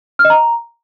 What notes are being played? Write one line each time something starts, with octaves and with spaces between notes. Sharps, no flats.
F6
D#5
A#5